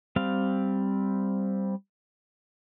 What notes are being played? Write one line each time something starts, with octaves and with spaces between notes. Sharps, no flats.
G3 C4 F5